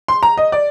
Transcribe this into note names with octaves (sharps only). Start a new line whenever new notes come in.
C6
A#5
D#5
D5